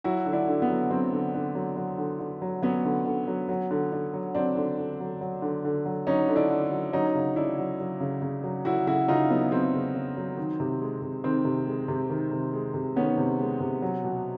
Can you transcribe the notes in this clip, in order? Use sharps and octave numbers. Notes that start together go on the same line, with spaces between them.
F#3 E4 F#4
D3
D4 E4
D3
B3
F#3
F#3 C4
D3
D3
F#3
F#3
D3
D3
F#3
F#3 B3 C#4
D3
D3
F#3
F#3
D3
D3
F#3
F#3 C4 D4
D3
D3
F#3
F#3
D3
D3
F#3
F#3 C#4 D#4
D3
D4 E4
D3
F#3
F#3 C#4 D#4
C#3
C#3 D4 E4
F#3
F#3
C#3
C#3
F#3
F#3 E4 F#4
C#3 E4 F#4
C#3 D#4 F4
F#3 B3
F#3 C4
C#3
C#3
F#3
D#3
C3
G#3
C3
D#3 C4
C3
G#3
C3
D#3
C3
G#3
C3
D#3 B3 C#4
C3
G#3
C3
F#3
B2